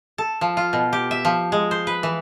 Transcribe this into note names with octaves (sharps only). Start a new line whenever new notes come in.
A4
F3
F4
B2
G4
E5
F3
G#3
C5
B4
E3